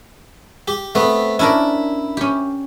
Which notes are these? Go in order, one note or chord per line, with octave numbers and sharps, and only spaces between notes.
G4
A3 B3 C4
C#4 D4 E4 A#4
C#4 G4